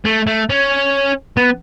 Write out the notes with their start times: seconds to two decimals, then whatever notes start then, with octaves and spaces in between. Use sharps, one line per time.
0.05 A3
0.27 A3
0.50 C#4
1.37 B3